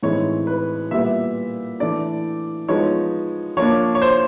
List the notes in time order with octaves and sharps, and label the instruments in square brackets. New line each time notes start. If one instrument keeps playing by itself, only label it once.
[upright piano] A2 E3 G#3 C4 D#4 C#5
B4
A#2 G3 B3 E5
E3 A3 D4 D5
F3 G#3 B3 D#4 C#5
F3 A#3 D4 C#5
C#5
C5